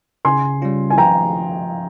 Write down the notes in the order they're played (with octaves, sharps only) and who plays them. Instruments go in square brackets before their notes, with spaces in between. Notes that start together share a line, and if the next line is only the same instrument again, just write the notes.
[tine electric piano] C#3 [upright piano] G#5 C6
[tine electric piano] G3 C#4 F4
[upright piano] G#5
[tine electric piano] F3 [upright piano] G5 A#5